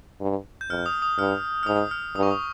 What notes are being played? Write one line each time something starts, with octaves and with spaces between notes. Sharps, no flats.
G2
G6
F2 F6
D#6
D#6
G2 F6
F6
G#2 D#6
F6
G2 D#6
C#6
D#6